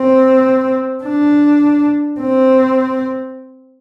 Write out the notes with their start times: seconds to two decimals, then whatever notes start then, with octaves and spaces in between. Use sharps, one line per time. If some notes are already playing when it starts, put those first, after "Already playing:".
Already playing: C4
1.04 D4
2.20 C4